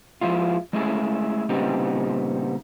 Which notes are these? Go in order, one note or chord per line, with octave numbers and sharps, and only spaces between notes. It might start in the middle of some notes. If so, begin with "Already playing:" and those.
F3 G#3 E4 F4
G#3 A3 C#4 E4 G#4
A#2 C#3 G3 B3 C4 D#4